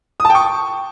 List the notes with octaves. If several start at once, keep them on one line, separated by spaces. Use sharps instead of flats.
D#6
A5
G5
C#6